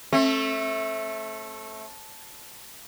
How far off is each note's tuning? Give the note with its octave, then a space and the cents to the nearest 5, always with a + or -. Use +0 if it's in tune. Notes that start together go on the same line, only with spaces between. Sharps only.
A3 -10 C4 +45